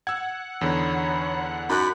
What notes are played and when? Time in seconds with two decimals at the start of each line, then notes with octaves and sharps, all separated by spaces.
0.07 F#5 E6 G#6
0.61 E2 D3 D#4 C#5 B5
1.70 F#2 D#4 B5 F#6